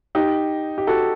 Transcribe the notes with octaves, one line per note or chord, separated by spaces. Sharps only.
D#4 G4
G4
F#4 A4